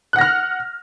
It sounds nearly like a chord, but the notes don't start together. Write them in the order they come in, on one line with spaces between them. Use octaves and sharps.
F#6 F#5 A#6 F6